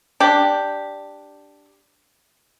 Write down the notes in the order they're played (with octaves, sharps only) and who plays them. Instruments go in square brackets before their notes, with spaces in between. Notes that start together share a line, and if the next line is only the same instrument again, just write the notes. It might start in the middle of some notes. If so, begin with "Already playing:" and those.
[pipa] D4 G4